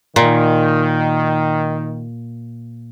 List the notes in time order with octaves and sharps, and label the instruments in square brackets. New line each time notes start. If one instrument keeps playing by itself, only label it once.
[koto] A#2 [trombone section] D#3